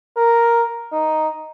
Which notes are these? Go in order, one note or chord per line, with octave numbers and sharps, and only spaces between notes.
A#4
D#4